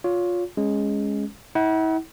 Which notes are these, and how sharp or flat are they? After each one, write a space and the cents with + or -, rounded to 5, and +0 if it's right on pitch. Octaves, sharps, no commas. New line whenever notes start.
F4 +20 C#5 +25
G#3 +0 C#4 +0
E4 -40 F#5 +30